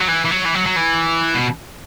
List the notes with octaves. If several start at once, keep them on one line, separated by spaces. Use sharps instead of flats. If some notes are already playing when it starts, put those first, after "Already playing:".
F#3
E3
E3
F#3
E3
F#3
F#3
E3
B2